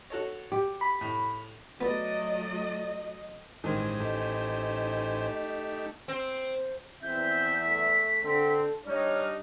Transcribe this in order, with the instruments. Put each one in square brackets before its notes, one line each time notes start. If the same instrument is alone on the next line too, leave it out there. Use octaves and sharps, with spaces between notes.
[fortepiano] F#4 A4 C#5
[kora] G4
[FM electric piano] B5
[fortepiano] A2
[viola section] F#3 A3 D#5 [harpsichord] B3 [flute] D5
[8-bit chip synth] A1 C5 G#5 [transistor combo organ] G2 G#3 [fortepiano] D#3
[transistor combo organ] A3 G4 [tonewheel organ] D#4
[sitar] C4
[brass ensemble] E2 E5 [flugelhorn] C4 [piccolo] G6
[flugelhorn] A3 [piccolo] B6
[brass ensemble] D3 C4 [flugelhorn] A4
[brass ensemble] G3 D4 D#4 [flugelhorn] C#5 [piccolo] F6